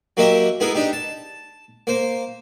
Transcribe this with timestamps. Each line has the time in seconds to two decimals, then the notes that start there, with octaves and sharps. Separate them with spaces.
0.17 F#3 A#3 G4 A#4 D#5 E5
0.60 B3 E4 G#4 A#4
0.75 D4 D#4 G4
0.93 A5
1.87 A#3 C5